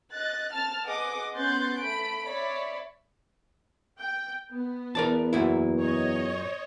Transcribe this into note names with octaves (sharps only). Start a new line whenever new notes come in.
D#5 F#6 A6
A5 F6 A6
G#4 B4 D#5 F#5 D6 D#6
B3 C#4 C6 F#6 G6 A6
A3 B5 D7
C#5 D5 E5 B5
G5
B3
E2 A#4 D5 A5
F#2 A#2 E4
C#5 D#5